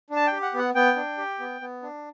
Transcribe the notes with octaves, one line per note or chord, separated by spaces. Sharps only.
D4
A5
G5
G4
F#5
B3 F#5
B3 G5
D4
G4
B3
B3
D4